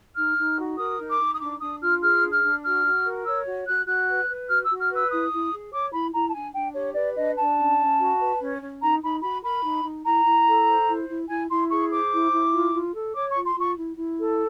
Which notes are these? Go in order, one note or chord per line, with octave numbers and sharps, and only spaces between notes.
D#4 F6
D#4
F#4
A#4 D#6
D#4
D6
D#4
D#6
D4 D6
D4 D#6
F4 F6
G#4 F6
D4
F6
D4
F#4 F6
F#4
A#4
C#5 E6
F#4
F#4 F#6
F#4 F#6
B4
B4
F#4 F6
E6
F#4
F6
B4
E6
E4 D#6
E4
G#4
C#5 D6
E4 B5
E4 A#5
A5
D4 G#5
D4 G5
G4 C#5
B4 D5
D4 D#5
D4 A5
C#4
C#4
F#4
B4
C#4
C#4
D#4 A#5
D#4 B5
F#4 B5
A#4 B5
D#4
D#4
E4 A#5
E4
A4
C5
E4
E4
E4 G#5
E4 C6
G#4 C#6
C5 D6
E4
E4
F4
F4
A4
C#5 D6
C#6
F4
C6
F4
C#6
E4
E4
A4